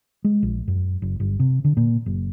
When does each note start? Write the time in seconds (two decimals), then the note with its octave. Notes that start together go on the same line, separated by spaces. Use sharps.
0.24 G#3
0.43 A#1
0.68 F#2
1.02 F#1
1.20 G1
1.40 C3
1.65 D3
1.77 A#2
2.06 F#1